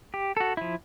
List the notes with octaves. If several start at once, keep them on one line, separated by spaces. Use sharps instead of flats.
G4
F#4 A4
F3 E4